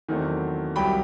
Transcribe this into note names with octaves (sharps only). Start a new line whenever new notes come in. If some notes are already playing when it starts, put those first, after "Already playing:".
E2 D#3 F#3 A3 C4
C2 C3 F#3 G5 B5